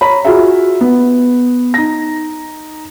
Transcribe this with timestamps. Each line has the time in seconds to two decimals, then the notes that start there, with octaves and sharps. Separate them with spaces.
0.01 C#5 A#5 B5
0.25 F4 F#4 G#4 E5
0.81 B3
1.74 D#4 A#6